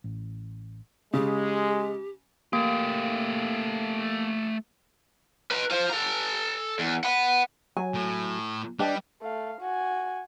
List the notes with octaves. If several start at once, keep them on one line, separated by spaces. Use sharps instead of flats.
A1
C#3 G#3 G4
A3 A#3 G4
B4 A#5
F4 C5
A4 A#5
E2
F#5 B5
F#3 G#5
A2
G3 D4 B4 D#5 G5
A3 F5
F#4 G#5